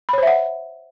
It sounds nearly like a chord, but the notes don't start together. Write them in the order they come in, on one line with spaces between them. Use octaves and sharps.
B5 C#5 C5 E5 F#5